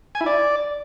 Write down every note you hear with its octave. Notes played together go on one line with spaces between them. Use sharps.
G#5
E4
D5